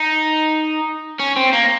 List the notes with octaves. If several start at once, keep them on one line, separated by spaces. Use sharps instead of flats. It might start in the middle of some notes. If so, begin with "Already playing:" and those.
Already playing: D#4
C#4
C4
A#3